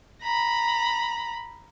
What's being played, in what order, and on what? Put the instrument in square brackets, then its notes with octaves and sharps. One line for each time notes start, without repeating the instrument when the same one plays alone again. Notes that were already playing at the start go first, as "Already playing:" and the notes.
[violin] A#5 B5